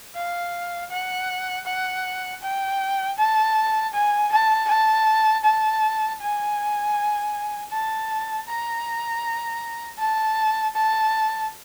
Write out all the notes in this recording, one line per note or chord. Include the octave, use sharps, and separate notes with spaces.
F5
F#5
F#5
G5
A5
G#5
A5
A5
A5
G#5
A5
A#5
A5
A5